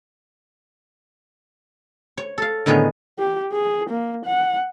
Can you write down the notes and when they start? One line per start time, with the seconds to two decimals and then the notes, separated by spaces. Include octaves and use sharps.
2.17 C#5
2.38 A4 F5
2.66 A2 D3 D#3 B3 G#4 C#5
3.19 G4
3.52 G#4
3.89 A#3
4.25 F#5